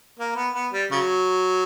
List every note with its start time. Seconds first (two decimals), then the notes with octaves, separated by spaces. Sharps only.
0.19 A#3
0.36 B3
0.54 B3
0.73 G3
0.91 C#3 F#3